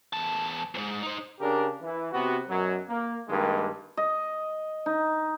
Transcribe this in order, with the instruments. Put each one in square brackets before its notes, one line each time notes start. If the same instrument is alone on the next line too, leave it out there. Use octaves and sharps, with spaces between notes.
[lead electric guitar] E2 A5
E2 G#2
D#4 C5
[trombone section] C#3 D4 G4 A#4
E3
C3 B3 F#4
F#2 B2 F#3
A#3
G2 D#3 G#3 A#3
[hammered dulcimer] D#5
D#4